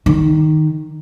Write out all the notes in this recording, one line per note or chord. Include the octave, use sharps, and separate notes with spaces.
D#3